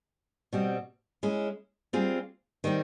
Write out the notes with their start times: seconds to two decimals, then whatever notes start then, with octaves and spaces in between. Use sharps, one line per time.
0.53 B2 G3 C4
1.23 G#3 C#4 E4
1.93 G3 C4 F4 G#4
2.64 D#3 G3 C4